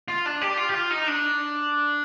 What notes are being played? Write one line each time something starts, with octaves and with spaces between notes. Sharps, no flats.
F4
D4
G4
F4
G4
F4
D#4
D4